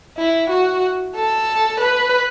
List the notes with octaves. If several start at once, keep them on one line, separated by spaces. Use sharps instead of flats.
E4
F#4
A4
B4